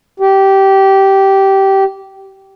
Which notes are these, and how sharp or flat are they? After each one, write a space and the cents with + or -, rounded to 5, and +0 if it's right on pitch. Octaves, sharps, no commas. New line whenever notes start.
G4 -15